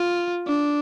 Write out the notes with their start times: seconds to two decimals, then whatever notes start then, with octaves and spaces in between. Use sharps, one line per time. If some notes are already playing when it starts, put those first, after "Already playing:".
Already playing: F4
0.48 D4